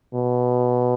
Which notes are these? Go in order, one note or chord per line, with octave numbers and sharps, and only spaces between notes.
B2